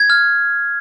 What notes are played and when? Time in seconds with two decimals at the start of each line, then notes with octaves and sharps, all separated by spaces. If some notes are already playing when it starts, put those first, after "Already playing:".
Already playing: G#6
0.10 F6